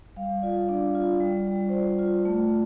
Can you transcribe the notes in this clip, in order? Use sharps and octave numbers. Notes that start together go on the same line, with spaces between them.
G3 F5
F4 D5
D4 D5
F4
G3
G3
C5
F4 D5
F4
A3